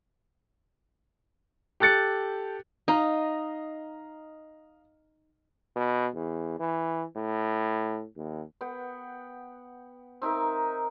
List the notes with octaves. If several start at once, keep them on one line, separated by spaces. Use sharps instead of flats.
G4 A4 F#6 A6 C#7
D#4 D#5 F5 A#5
B2
E2
E3
A2
D#2
B3 F#5 G5
C4 D#4 A#4 E5